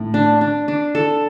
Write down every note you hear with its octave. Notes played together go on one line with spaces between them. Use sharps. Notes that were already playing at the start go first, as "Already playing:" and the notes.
Already playing: A2
D4
D4
D4
A4